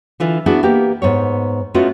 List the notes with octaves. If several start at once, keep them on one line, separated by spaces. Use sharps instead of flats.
D3 E3 F4
B3 D4 E4 F#4 G#4
A#3 B3 G4
G#2 B3 C#5
G#3 A3 B3 C#4 F4 F#4